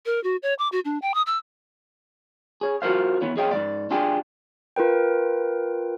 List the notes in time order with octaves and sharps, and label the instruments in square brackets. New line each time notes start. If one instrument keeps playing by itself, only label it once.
[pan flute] A#4
F#4
C#5
D6
F#4
D4
G5
D#6
E6
[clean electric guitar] G#4 C#5
F4 F#4 A#4 C5 F5
E3 B3 E4 C#5
E2 G#4 C#5 D#5 F5 G5
G#2 G#3 D5
D4 F4 G4 G#4
[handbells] F4 A#4 B4 G5